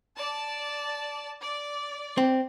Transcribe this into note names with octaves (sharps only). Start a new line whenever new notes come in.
D5 A5
D5
C4